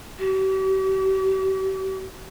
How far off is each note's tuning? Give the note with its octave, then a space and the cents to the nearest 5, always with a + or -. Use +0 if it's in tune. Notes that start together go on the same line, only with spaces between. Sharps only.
G4 -45